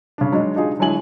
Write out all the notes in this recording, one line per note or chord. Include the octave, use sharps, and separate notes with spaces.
C#3 D4
F#3 G#3 D4 D#4
D4 D#4 F4 G#4
D3 F#3 G#3 E4 G#5 F#7